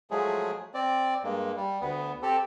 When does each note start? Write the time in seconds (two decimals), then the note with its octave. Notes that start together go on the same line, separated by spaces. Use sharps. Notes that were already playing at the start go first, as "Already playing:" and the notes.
0.11 F3 F#3 G#3 A3 G#4
0.74 C4 D5
1.23 G2 G#3 A#3
1.56 G3
1.81 D2 B3
2.23 C4 G4 A4